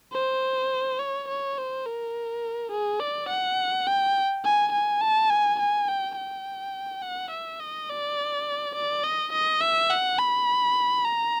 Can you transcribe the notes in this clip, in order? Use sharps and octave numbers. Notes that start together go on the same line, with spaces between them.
C5
C#5
C#5
C5
A#4
G#4
D5
F#5
G5
G#5
G#5
A5
G#5
G#5
G5
G5
F#5
E5
D#5
D5
D5
D#5
D#5
E5
F#5
B5
A#5